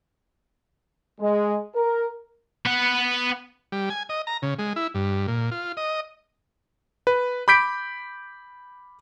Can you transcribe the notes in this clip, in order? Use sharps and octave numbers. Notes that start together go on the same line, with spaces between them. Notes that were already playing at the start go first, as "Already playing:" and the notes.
G#3
A#4
B3 F#5
G3
G#5
D#5
A#5
C#3
G#3
E4
G2
A#2
F4
D#5
B4
B5 D6 G6 B6 D7